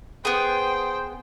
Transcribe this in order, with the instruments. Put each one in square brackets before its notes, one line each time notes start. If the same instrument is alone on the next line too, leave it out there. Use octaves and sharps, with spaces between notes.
[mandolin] B3 G#4 [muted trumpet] C5 [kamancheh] G5